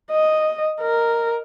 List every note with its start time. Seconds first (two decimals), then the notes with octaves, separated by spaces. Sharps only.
0.11 D#5
0.82 A#4